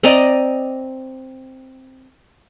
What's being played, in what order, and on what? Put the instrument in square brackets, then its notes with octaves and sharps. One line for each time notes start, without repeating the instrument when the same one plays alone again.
[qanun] C4 D5 D#5 A#5